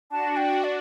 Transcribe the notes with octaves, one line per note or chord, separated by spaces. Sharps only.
D4 F#4 A5
G5
D5